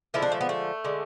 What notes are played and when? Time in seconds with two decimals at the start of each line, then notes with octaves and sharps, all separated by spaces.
0.14 D3 F3 G#3 E4
0.22 D4
0.32 A3
0.41 B3
0.49 A3
0.84 D3 G#3